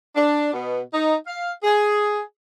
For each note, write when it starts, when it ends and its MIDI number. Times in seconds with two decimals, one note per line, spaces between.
0.15 0.52 62
0.53 0.80 47
0.93 1.15 63
1.26 1.51 77
1.64 2.20 68